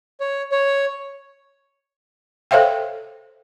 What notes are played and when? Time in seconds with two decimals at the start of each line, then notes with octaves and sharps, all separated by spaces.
0.20 C#5
0.52 C#5
2.51 A4 C5 C#5 E5 F5 G5